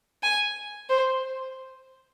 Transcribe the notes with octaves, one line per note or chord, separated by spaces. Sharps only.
G#5
C5